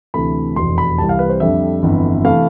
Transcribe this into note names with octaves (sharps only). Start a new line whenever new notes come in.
D2 C3 E3 A3 B5
F1 E2 B2 C6
B5
C2 C3 E3 G3 A5
F5
B4
C5
F2 D3 G3 E5
G1 F2 E3
C3 E3 A3 F5